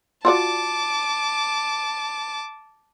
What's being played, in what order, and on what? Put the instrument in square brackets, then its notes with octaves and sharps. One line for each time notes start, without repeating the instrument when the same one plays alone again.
[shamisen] F4 F#4 D5 [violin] A5 D6